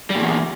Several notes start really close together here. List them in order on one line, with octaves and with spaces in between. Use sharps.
G3 A#2 E2